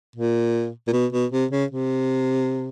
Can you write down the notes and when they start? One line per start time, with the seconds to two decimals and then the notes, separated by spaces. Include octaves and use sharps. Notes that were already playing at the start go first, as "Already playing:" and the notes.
0.16 A#2
0.88 A#2
0.93 B2
1.13 B2
1.32 C3
1.51 C#3
1.71 C3